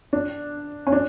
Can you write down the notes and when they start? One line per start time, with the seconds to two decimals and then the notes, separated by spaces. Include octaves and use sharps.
0.13 D4
0.87 C#4
0.92 D4